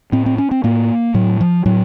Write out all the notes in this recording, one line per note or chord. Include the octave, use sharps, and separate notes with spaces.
A2 C4
C4
C#4
C4
A2 A#3
A2 F#3
F3
A2 F#3